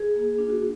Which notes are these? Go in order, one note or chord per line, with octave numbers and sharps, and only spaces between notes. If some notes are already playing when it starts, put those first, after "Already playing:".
Already playing: G#4
A#3
D4 F4
F#4